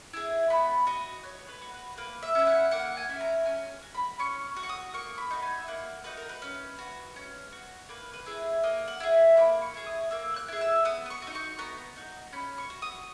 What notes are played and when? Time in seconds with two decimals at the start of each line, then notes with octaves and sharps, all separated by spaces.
0.13 E4 G#4
0.50 B3 B5
0.87 F#4 D#5
1.23 B3 C#5
1.48 B4
1.62 F#4
1.74 B4
1.97 A#3 B4
2.23 E5
2.35 C#4 E4
2.47 F#5
2.71 A#3 F#5
2.97 G#5
3.09 C#4 E4
3.21 A#5
3.46 C#4 G#5
3.82 F#4
3.95 B5
4.19 C#4 C#6
4.56 F#4
4.63 C#6
4.69 D#6
4.93 A#3 C#6
5.18 B5
5.30 D#4 F#4
5.42 G#5
5.58 E5
5.68 A#3 F#5
6.04 D#4 F#4 B4
6.17 A#4
6.29 B4
6.42 C#4
6.79 F#4
7.16 C#4
7.52 F#4
7.89 A#3 B4
8.14 B4
8.26 E4 G#4
8.63 A#3 D#5
8.88 F#5
9.00 E4 G#4
9.37 A#3 B5
9.62 C#6
9.74 E4 G#4
9.86 D#6
10.11 A#3 E6
10.36 F#6
10.48 E4 G#4
10.61 E6
10.85 B3 D#6
11.06 D#6
11.10 C#6
11.22 D#4 F#4
11.35 C#6
11.59 B3 A#5
11.96 D#4 F#4
12.32 C#4 B5
12.58 C#6
12.70 F#4
12.82 D#6